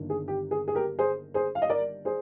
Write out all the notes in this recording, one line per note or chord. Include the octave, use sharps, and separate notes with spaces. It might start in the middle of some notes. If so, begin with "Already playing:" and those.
Already playing: G1 D#3 A#3 D4
G#4
G4
G#4
G#4
G4 A#4
G#4 C5
G#4 C5
F5
D#5
A#4 D5
G#4 C5